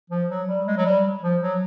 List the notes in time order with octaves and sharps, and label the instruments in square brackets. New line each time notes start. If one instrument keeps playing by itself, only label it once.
[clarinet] F3
F#3
G3
G#3
F#3
G3
F3
F#3